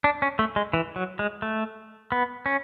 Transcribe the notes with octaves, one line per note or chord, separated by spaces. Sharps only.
D4
C#4
A3
G#3
E3
F#3
G#3
A3
B3
C#4